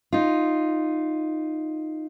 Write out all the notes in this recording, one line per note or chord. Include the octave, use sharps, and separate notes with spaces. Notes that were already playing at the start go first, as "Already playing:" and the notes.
D#4 F4